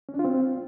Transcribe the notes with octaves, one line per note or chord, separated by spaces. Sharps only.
C#4
D4
F4
C4